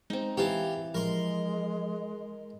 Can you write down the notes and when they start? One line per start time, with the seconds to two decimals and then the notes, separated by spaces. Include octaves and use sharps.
0.10 G#3 C4 D#4
0.37 E3 G4 F5 A5 A#5
0.94 F3 G#3 A#4 C6